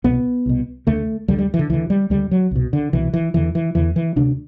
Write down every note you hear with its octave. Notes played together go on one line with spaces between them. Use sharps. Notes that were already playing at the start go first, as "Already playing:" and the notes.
C2 B2 B3
C2 B2
D2 D3 A3
D2 D3 G3
G3
E3
D3
D2 D3 E3
G3
D2 D3 G3
F#3
C2 B2
D3
C2 B2 E3
E3
E2 D3 E3
E3
E2 D3 E3
E3
D2 C3 D4